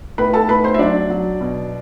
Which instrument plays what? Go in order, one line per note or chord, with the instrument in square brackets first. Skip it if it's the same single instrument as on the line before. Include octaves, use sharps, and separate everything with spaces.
[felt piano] A2 B4 B5
A4 A5
A2 B4 B5
C5 C6
E5
F#3 D4 D5
F#3
B2